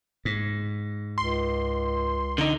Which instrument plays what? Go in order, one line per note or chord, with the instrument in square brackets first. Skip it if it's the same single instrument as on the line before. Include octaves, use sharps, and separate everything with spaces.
[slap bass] G#2
[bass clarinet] C#2 [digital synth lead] C6
[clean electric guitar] D3 D#4